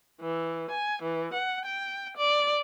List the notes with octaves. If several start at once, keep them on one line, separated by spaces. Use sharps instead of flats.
E3
G#5
E3
F#5
G5
D5